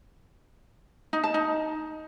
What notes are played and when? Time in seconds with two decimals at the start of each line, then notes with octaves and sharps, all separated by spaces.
1.13 D#4
1.24 A5
1.34 D#4